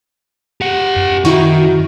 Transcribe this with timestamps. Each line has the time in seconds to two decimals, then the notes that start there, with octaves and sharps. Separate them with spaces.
0.61 G4 F#5
0.96 F#2
1.25 D#3 E4 F#4